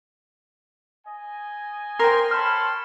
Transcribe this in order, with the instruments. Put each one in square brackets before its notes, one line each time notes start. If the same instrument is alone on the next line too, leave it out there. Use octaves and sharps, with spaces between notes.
[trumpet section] D#5 G#5
[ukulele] A#4 C5 [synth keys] G5 C6
[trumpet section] C#5 A5 B5 [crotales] F6